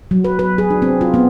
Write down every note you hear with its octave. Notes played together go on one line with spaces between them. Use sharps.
F#3
B4
B4
G#4
D4
C4
F4
B3